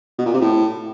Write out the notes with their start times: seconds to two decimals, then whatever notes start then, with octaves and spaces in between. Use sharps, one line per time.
0.18 B2
0.26 A#2
0.34 C3
0.41 A2